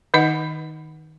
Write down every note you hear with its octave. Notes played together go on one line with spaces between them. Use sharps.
D#3 D#4 D#5 F#5